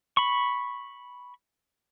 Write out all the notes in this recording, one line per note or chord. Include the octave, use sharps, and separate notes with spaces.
B5 C#6